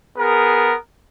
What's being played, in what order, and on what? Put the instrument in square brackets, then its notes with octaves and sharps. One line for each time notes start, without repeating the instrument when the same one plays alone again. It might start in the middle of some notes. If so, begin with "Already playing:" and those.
[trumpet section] B3 G#4 A#4